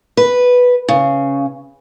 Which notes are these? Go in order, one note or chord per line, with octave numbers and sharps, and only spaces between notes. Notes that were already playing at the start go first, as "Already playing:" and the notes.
B4
C#3